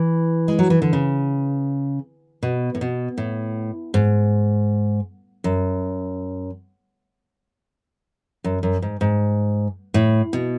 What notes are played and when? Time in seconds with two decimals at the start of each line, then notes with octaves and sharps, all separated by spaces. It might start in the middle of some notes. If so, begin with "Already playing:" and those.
Already playing: E3
0.48 G#3
0.59 F#3
0.70 E3
0.82 D3
0.93 C#3
2.43 B2
2.75 A2
2.81 B2
3.18 A2
3.94 G#2
5.44 F#2
8.44 F#2
8.63 F#2
8.82 G#2
9.01 G#2
9.94 A2
10.33 B2